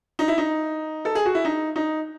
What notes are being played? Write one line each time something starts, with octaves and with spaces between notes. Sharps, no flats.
D#4
E4
D#4
A4
G#4
F#4
E4
D#4
D#4